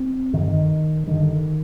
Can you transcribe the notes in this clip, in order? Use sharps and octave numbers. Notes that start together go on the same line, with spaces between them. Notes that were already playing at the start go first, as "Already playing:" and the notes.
Already playing: C4
G2 D3 D#3
F3
D#3
G2 D3 D#3